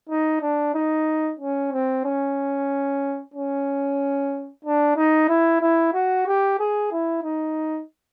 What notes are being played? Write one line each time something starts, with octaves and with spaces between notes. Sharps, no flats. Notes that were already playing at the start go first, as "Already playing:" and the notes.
D#4
D4
D#4
C#4
C4
C#4
C#4
D4
D#4
E4
E4
F#4
G4
G#4
E4
D#4